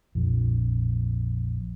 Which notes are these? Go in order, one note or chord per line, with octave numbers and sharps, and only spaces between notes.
A#1 F2